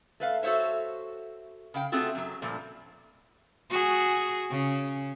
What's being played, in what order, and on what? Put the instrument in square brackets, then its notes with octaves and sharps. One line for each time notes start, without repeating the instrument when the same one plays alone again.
[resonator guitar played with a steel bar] A3 B4 F5
F#4 A4 C5 C#5 E5
C#3 F5 G5
A3 C4 F4 F#4 G#4 A4
F#2 F#3
G2 A#2 F3 A3
[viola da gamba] F#4 G#4
C#3